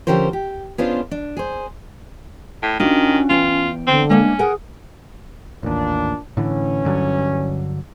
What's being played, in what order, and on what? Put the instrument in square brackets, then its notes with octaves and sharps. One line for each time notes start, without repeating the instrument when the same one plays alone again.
[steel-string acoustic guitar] D3 F3 C#4 G4 A#4 C5
G4
B3 C#4 D4 F4 G#4 C5
D4
G#4 C5
[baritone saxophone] A2
[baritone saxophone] D#3 [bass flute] C#4 [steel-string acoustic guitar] D4 F4 F#4
[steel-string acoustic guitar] E2 G5 [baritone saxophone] F4
[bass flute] D3 [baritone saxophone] C4
[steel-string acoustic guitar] G#3 A#3 D4 [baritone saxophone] C#4
[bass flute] G#4 [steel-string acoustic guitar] A#4 F#5 G#5
[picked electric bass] A1 D#2 [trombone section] A#2 D4
[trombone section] A1 C#4 [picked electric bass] A2 D3 E3
[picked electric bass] G2 D3 F#3